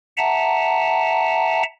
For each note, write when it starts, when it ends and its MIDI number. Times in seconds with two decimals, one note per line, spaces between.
0.17 1.62 76
0.17 1.62 78
0.17 1.62 81
0.17 1.62 82